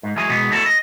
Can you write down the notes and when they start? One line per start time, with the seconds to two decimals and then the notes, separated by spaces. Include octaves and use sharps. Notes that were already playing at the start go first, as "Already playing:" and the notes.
0.03 G#2
0.16 E3 F#3 G#3 G#5
0.30 B2 E3 G#3 B3
0.51 E2 A3 E4 F#4 A4 A5
0.66 D#5